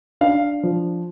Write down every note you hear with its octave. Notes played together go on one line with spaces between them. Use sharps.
D4 F5
F3